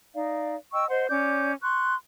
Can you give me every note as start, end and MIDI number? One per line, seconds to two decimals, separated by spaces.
0.14 0.55 63
0.14 0.55 74
0.14 0.55 77
0.73 0.88 75
0.73 0.88 79
0.73 0.88 85
0.73 0.88 88
0.89 1.07 72
0.89 1.07 75
0.89 1.07 78
0.89 1.07 84
1.09 1.52 61
1.09 1.52 74
1.09 1.52 86
1.09 1.52 91
1.62 1.94 84
1.62 1.94 85
1.62 1.94 90